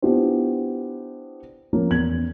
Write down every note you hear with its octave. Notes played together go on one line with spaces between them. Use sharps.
B3 D4 E4 F4 G4 C5
F3 A#3 C#4
E2 G#6 F#7